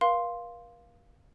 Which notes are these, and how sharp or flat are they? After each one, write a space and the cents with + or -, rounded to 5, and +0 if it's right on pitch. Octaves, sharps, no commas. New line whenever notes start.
A#4 +45 F5 +0 C6 +0